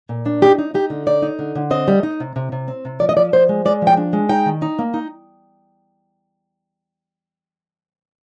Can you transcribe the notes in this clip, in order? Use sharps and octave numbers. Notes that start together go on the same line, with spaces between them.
A#2
D4
D#4 G4
D#4
D#4 G4
D3
D#4 D5
D#4
D3
D3
C4 D#5
G3
D#4
C3
C3
C3
C4
C3
F3 D5
D#5
F3 D5
F3 C5
G#3
G#3 D5
F3
G5
D4
G#3
D#4 G5
D#3
D#4
A#3
D#4